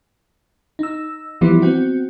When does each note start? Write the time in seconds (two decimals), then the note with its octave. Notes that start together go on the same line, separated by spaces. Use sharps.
0.79 D#4 E6
1.41 E3 F3 G3 B3 E4
1.62 B3 C4 F#4